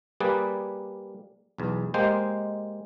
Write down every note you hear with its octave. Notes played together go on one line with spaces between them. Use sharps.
G3 A#3 G#4 B4 D5
B1 E2
G#3 A#3 G4 C5